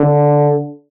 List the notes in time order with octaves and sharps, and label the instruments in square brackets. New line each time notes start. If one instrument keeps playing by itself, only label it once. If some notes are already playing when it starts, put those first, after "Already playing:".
Already playing: [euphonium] D3